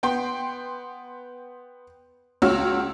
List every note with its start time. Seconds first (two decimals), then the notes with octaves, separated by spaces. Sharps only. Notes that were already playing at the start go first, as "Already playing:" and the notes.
0.03 B3 G5 C6
2.42 C#2 C#4 F#4 C#5 E6 F6